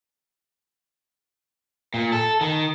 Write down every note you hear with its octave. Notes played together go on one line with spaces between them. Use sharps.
A#2
A4
D#3